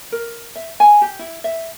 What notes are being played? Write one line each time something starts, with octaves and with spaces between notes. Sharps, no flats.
A#4
E5
G#5
G4
E4
E5